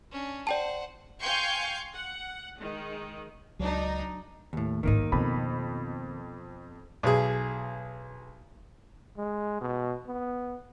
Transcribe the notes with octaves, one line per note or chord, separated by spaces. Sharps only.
C#4 D4
C5 D5 F#5 G5 A5
F5 G5 G#5 C6 C#6 G6
F#5
D#3 G#3
C#2 F#3 D4 D#4
D#2 A2
A1 G#2 D#3 A#3 D#4
F2 B2 B5
B1 G#4
G#3
B2
B3